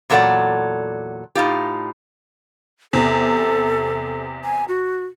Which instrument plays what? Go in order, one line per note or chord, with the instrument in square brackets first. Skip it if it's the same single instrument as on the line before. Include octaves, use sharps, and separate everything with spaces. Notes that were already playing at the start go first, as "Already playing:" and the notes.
[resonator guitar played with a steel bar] E2 A#2 F#3 A4 D5 F#5
A2 D#4 F4 G4
[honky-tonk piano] E2 C3 [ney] A4
[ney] G#5
F#4